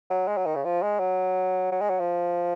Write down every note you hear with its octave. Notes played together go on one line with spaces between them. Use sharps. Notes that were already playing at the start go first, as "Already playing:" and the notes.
F#3
G#3
F#3
D#3
C#3
F3
G#3
F#3
F#3
G#3
F#3
F3